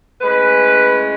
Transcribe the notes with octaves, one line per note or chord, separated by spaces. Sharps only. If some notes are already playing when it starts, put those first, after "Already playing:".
A2 G#3 C#4 B4